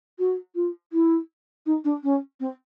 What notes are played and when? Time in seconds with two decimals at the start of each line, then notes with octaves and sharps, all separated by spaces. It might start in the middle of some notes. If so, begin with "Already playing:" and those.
0.19 F#4
0.55 F4
0.93 E4
1.66 D#4
1.85 D4
2.03 C#4
2.40 C4